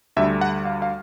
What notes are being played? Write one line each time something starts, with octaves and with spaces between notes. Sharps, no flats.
D2 D3 G3 E5
F#5
F5
F5